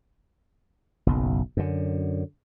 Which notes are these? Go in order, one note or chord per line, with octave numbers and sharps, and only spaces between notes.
F#1 B1
F#2 D3